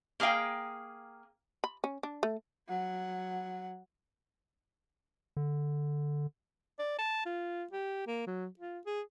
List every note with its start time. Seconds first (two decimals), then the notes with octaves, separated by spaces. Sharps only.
0.20 A#3 G#4 D5 F5 G5
1.64 B5
1.84 C#4
2.03 D4
2.23 A3
2.68 F#3 F#5
5.37 D3
6.79 D5
6.98 A5
7.26 F4
7.72 G4
8.07 A#3
8.27 F#3
8.59 F4
8.86 G#4